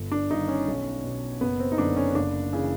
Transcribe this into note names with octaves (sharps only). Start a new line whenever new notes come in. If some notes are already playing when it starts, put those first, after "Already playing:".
Already playing: G1
D4
G2 D#3 D#4
C#4
B1
B2
F#1 B3
C4
D#4
F#2 D3 D4
C#4
F#1 D4
C#3 E3